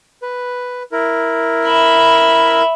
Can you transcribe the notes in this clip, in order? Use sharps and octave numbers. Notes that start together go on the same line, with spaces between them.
B4
E4 A#4
E5 B5